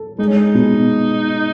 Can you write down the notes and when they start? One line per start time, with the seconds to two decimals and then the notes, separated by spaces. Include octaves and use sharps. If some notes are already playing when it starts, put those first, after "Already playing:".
Already playing: A4
0.18 G#3 D#4
0.27 C#4
0.36 D#4
0.54 B2